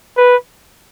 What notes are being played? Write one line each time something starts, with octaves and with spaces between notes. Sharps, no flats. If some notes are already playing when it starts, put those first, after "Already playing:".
B4